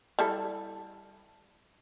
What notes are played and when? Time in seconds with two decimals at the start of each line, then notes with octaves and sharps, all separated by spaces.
0.19 G3 E4 A4